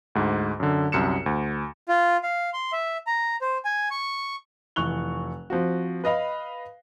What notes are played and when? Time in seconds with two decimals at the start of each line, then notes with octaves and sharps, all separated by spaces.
0.15 D2 G#2
0.60 F#2 D3
0.92 C2 F#2 C#7 E7
1.26 D2
1.88 F4
2.23 F5
2.53 C6
2.72 E5
3.07 A#5
3.41 C5
3.65 G#5
3.91 C#6
4.76 F1 E3 C#6 F#6 F7 G7
5.50 F3 C4 F#4
6.04 B4 D#5 F5 B5